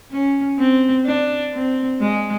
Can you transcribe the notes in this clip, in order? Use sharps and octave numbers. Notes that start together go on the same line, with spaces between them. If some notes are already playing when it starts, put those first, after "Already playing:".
C#4
C4
D4
C4
G#3